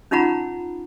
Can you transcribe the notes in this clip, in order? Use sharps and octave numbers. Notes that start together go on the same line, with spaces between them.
C#4 D#4 F4 F#5 A#5 B5